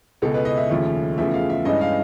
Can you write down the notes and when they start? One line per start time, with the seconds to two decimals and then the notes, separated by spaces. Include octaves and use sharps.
0.22 C#2 B2 G#3 A4
0.34 B4
0.45 D#5
0.57 E5
0.70 D#2 C#3 F3 A3 C#4
1.18 E2 C#3 F3 A3 E5
1.34 F5
1.50 E5
1.65 G2 E3 G#3 C#4 D#5
1.81 F5